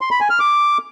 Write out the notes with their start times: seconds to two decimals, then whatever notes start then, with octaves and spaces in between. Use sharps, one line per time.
0.01 C6
0.11 B5
0.20 G#5
0.30 F6
0.40 D6